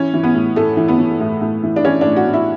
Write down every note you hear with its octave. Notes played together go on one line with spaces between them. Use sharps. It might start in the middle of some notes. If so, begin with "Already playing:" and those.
Already playing: E3 C#4
E3
B3
A2
A2 A3
E3
B3
E3
A2
A2
E3
D4
E3 C#4
D4
A2
F#4
A2
E4